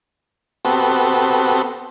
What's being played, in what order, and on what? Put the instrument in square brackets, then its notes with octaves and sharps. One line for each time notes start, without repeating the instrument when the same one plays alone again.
[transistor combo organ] B3 C4 F#4 G4 A4